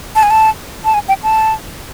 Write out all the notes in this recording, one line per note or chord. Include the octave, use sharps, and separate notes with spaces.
A5
G#5
A5
A5
G#5
G5
A5